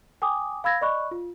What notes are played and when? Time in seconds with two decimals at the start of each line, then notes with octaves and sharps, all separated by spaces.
0.22 G5 G#5 D6 D#6
0.64 F5 B5 E6 G#6 A#6
0.81 D5 D#5 B5 C#6 F#6
1.11 F4